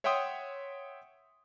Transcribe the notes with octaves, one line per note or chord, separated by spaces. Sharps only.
C#5 E5 F#5 G5 C6 D#6